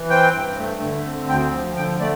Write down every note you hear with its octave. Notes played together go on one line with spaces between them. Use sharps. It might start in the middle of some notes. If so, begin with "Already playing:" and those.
Already playing: E3
C4 G5
G2
A3
D3
C4
D2 G5
F3
D3 G5
A3 D5